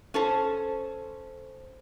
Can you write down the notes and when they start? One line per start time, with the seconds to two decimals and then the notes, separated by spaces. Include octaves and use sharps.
0.14 C#4 A4 C5